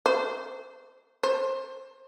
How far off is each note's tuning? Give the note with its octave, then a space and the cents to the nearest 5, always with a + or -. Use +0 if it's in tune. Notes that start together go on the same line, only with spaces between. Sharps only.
C5 -25
C5 +20